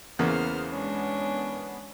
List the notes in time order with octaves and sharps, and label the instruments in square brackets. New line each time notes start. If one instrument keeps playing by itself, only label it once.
[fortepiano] E2 C#3 A#3 [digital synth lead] B3 [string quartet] C5 F6
[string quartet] G#3 C#4 D4